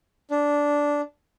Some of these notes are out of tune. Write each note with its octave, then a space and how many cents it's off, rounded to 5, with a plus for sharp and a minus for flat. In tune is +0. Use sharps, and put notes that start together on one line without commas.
D4 -10